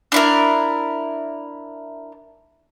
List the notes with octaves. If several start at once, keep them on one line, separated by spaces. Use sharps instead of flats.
D4 E4 A#4